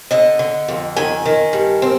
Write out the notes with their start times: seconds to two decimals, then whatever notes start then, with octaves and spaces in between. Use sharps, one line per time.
0.11 D3 D#5
0.39 D3
0.68 F2
0.96 D#3 G#5
1.26 D#3
1.53 G2
1.82 C4